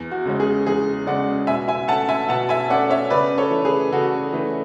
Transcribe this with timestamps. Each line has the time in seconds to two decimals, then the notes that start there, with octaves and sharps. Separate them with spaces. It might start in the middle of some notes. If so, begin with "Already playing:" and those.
Already playing: E2
0.11 F#4
0.25 C#3 G#3 C#4
0.40 G#4
0.66 E2 G#4
1.07 C#3 G#3 C#4 D5 F#5
1.47 B2 E5 G#5
1.68 E5 G#5
1.88 A3 C#4 F#5 A5
2.09 E5 G#5
2.29 B2 F#5 A5
2.49 E5 G#5
2.69 A3 C#4 D5 F#5
2.90 C#5 E5
3.10 C#3 B4 D5
3.38 A4 C#5
3.51 E3 A3
3.65 G#4 B4
3.92 C#3 F#4 A4
4.33 E3 A3